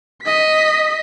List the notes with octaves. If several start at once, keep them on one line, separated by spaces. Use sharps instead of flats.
D#5 B6